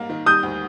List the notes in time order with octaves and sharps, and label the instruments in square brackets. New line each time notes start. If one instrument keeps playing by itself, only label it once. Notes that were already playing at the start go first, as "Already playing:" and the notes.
Already playing: [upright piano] G#2 G3 A#3
D#3
[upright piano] G3 [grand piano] D#6 G6
[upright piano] D2